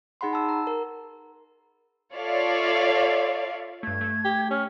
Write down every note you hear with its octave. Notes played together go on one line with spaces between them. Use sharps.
D#4 G#4 F#5 B5 C6
A5 E6
A#5
A#4
F4 A4 C#5 D5 E5 F5
G2 A3 G#6
A3
G4
C#4 F6